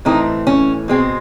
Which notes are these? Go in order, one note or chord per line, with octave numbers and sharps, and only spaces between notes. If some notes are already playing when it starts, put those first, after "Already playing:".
A2 E3 A3 C4 D#4
C#4
B2 G#3 C4